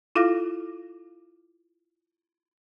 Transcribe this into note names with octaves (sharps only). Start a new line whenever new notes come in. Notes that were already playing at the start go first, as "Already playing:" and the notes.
E4 F4 A4 F5 F6 A#6